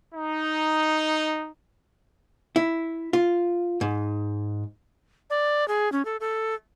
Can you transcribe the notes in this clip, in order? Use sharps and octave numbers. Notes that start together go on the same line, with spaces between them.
D#4
E4
F4
G#2
D5
G#4
C#4
A4
A4